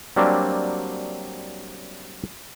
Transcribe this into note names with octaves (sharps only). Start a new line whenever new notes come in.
F#3 G3 A#3 C4 D4